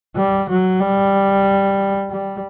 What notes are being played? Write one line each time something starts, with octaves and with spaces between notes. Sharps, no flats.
G3
F#3
G3
G3